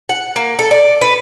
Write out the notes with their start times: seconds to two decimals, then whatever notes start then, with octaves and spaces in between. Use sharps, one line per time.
0.09 F#5
0.36 A#3
0.59 A4
0.71 D5
1.01 B4